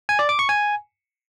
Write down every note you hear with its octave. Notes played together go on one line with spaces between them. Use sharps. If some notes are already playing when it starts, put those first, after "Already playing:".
G#5
D5
D6
C#6
G#5